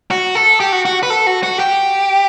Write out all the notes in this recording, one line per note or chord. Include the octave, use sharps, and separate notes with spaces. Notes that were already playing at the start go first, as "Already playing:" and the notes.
F#4
A4
G4
F#4
F#4
B4
A4
F#4
F#4
G4